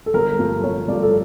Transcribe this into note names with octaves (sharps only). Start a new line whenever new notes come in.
A4
G1 A#4
G2 F3 A3
G1 C#5
G2 F3 A3 D5
A4